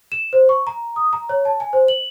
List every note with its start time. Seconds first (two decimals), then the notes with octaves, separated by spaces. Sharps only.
0.12 E7
0.33 C5
0.49 C#6
0.67 A#5
0.96 D#6
1.13 A#5
1.29 C#5
1.45 A5
1.60 G#5
1.73 C5
1.88 F#7